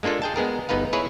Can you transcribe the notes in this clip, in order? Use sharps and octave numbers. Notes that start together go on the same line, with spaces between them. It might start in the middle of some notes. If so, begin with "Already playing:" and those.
G#3 A#3 D4 F4 A4
G#4 G5 A5
G#3 B3 G#4 A#4
G1 B3 D#4 B4 F5
E4 G#4 B4 C#5